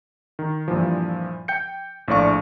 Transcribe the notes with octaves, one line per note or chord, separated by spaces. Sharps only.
D#3
G2 A#2 E3 F3
G5 G6 C#7
A#1 A2 D4 D5 F5 C#6